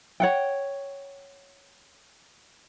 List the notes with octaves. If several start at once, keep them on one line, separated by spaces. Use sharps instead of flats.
C#5 F#5 G5